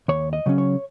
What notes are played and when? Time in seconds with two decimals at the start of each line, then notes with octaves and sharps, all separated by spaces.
0.08 D#2 C#5
0.33 D#5
0.46 C#3 F#3 C#4
0.58 C#5